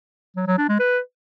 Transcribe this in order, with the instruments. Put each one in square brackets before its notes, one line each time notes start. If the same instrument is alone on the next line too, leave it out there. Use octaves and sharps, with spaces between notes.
[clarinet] F#3
F#3
D4
G#3
B4